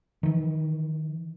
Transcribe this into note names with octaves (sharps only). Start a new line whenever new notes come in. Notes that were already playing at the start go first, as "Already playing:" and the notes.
D#3 E3